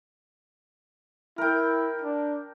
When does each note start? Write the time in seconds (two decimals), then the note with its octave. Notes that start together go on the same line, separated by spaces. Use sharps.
1.38 E4 A#4 G5
2.02 D4